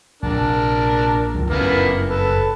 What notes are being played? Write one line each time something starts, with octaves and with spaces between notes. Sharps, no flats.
A#1 C3 D4 A#4
C#2 D3 F3
F#1 G2 A#3 B3 C#4 E4
A4 B4